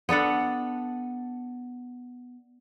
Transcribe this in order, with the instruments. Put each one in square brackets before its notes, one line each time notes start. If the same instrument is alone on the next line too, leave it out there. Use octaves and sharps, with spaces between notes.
[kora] B3 D4 A4 F#5